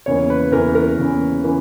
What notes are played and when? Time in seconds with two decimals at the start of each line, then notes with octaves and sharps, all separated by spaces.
0.06 E2 C#3 E3 A#3 C#5
0.30 B4
0.52 E2 C#3 E3 A#3 A#4
0.75 A#4
0.97 E2 C#3 E3 A#3
1.44 C#3 E3 A#3